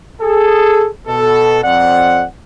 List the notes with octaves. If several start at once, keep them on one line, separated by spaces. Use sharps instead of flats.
G#4 A4
B2 A4
F2 C4 D5 F#5